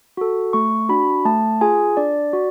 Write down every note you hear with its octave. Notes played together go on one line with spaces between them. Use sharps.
F#4 A4
A3 C#6
D4 F#4 B5
A3 A5
F4 G#4 G#5
D4 D5
F#4